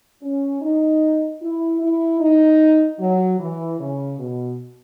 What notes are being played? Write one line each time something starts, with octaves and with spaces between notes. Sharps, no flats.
C#4
D#4
E4
E4
D#4
F#3
E3
C#3
B2